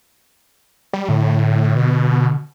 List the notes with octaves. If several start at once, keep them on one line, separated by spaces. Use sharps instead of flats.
G3
A2 D3
B2